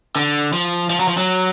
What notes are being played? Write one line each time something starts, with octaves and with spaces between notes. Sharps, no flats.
D3
F3
F3
F#3
F3
F#3